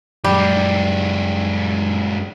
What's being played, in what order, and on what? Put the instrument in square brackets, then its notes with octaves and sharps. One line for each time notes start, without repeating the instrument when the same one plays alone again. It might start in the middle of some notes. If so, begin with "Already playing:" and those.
[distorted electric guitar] F#2 G#3 [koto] G3